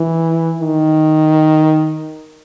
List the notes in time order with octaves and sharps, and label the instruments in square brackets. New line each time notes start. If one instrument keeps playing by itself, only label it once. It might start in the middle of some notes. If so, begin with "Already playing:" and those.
Already playing: [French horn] E3
D#3